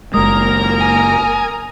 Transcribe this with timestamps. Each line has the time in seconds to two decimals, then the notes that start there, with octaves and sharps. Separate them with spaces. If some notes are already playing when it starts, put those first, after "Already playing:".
0.14 F#1 G#3 A#3 A#4 A#5 D#6
0.81 G#5